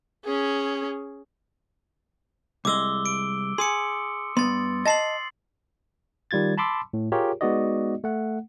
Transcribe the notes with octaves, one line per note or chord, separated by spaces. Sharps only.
C#4 G#4
C2 G#3 D6 E6 G7
D7
G#4 C6 D#6 C#7
G2 B3 C6 A6
D#5 A5 A6 C7 F#7
D#3 G3 F4 G#6 A6
A5 B5 C6 D6 E6
A2
F4 G4 G#4 A#4 C#5
G#3 B3 D#4 F#4 D5 D#5
A3 F#5